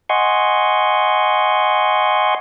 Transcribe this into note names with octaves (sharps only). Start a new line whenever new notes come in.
D#5 F#5 G#5 C6 C#6